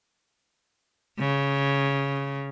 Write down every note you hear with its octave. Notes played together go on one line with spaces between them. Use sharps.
C#3